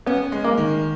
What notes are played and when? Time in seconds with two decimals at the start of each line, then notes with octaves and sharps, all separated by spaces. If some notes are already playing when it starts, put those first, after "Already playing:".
0.06 B3 C#4
0.32 G#3
0.44 A#3
0.58 D#3